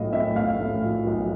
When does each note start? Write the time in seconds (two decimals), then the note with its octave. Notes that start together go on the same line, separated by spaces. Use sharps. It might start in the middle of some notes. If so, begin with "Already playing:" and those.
Already playing: B1 A2 F3 D#5 F5
0.13 A2 E5
0.36 A2 F5
0.60 A2
0.83 F3
1.06 B1